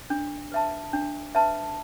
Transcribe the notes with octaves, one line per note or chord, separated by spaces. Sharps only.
D4
B4 E5 A5
D4
B4 E5 A5